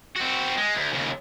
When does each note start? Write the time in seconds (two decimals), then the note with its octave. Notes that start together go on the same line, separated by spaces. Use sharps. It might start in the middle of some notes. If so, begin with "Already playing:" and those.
0.16 C4 F#4
0.57 G#3
0.75 D2
0.93 D#2 C#3